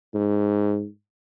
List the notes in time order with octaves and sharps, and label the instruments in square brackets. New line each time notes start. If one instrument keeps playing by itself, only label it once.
[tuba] G#2